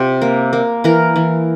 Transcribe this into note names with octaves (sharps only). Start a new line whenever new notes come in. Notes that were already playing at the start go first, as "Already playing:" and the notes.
Already playing: C3 F4 G4
A#3
A#3
E3 A#4
E3